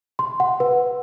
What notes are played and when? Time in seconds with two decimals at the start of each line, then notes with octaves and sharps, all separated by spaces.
0.19 C6
0.40 F#5
0.60 B4